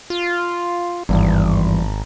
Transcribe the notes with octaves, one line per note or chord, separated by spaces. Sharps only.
F4
G#1 E2 G2